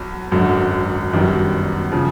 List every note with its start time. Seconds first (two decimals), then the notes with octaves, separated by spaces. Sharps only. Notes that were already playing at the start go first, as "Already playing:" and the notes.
Already playing: B1 F#3
0.32 G#1 F#2 D3
1.12 G1 F#2 D#3 G3
1.92 C#3 F3